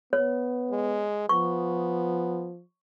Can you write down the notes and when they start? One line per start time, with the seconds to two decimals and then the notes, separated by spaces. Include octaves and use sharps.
0.13 B3 C#5
0.71 G#3
1.29 F3 B3 C#6